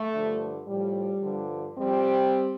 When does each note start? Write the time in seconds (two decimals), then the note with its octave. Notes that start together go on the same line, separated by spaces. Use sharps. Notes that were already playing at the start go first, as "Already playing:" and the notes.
Already playing: A3
0.14 G2 D3 F3
0.68 A2 F3 G3
1.23 G2 D3 F3
1.77 F2 F3 G3 C4